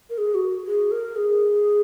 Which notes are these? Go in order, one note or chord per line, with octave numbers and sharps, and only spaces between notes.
A#4
G#4
F#4
G#4
A#4
G#4